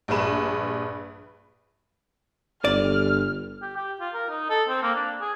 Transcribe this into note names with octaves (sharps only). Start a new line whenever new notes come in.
A#1 G2 G#4 B4 E7
G1 D5 F6
G4
G4
F4
A#4
D#4
A4
C4
A#3
D4
G#4